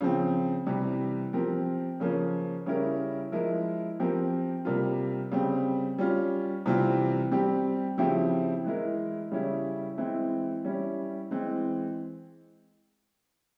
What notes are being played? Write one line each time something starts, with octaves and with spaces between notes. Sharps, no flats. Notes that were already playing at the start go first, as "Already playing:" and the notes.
C#3 F3 C4
C3 E3 G3
F3 C4 G4 A#4
C#3 F3 A#3 C#4
C#3 G3 C#4 E4 A#4
F3 G#3 E4 A#4
F3 C4 G4 A#4
C3 G3 A#3 F4
C#3 G3 C4
G3 C#4 F4
C3 E3 G3 C4 F4
G3 C4 G4
C#3 F3 C4 E4 G4
E3 G#3 E4 A#4
C#3 G3 C#4 E4
E3 G#3 C4 E4
G3 C#4 E4
E3 G#3 C4